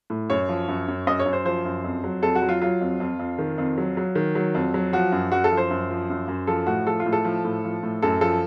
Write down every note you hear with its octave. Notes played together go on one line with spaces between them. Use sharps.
A2
F#2 C#5
F3
F#2
F#2
F#2 D#5
C#5
F#2
C5
F3 C5
F#2
F2
F#3
F2 A4
F#4
F#3
F4
F#3 F4
F2
F2
F2
D#3
F2
F#3
F#3
D#3
F#3
F2
F#3
F3 F#4
F#2
F#2 F#4
A4
F3
C5
F#2
F3
F#2
F#2
F3 A4
A2 F#4
F3 A4
F4
A2
A4
F3
A2
F3
A2
F#2 A4
F3 A4